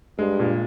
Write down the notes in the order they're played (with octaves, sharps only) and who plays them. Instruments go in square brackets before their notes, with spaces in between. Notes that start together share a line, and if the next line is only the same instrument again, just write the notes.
[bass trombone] G2 [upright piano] G#3
[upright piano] A#2